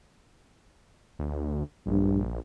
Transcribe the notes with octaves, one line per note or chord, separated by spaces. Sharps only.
D2
A#1 G2